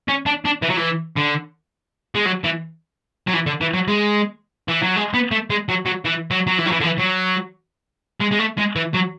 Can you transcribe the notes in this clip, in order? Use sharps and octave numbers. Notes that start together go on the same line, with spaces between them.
C#4
D4
D4
E3
F#3
E3
D3
G#3
F#3
E3
F#3
E3
D3
E3
F#3
G#3
E3
F#3
G#3
B3
A3
G#3
F#3
F#3
E3
F#3
F#3
E3
F#3
E3
D3
E3
F#3
G#3
G#3
A3
G#3
E3
F#3